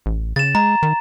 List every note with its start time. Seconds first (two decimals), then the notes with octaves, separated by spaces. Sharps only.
0.06 A1
0.36 C#3 A6 E7
0.55 G#3 A#5
0.83 D#3